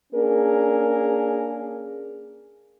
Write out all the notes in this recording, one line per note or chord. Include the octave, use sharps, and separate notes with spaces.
A#3 C#4 D4 G#4 A#4